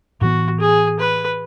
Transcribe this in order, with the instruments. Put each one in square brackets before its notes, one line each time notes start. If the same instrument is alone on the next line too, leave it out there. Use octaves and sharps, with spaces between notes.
[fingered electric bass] A2 E3 B3 [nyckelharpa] F#4
[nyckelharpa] G#4
B4